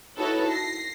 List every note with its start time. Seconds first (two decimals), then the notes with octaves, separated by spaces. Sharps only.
0.19 D#4 E4 F#4 A4 B4 C#5
0.50 A#6 C7